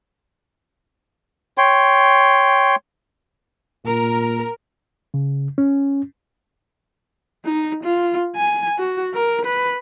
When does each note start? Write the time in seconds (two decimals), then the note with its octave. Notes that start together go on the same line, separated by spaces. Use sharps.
1.58 C#5 G5 C6
3.85 A#2 A#4
5.14 C#3
5.58 C#4
7.45 D#4
7.83 F4
8.36 G#5
8.79 F#4
9.14 A#4
9.45 B4